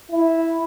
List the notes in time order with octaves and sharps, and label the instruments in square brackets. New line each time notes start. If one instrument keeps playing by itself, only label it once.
[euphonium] E4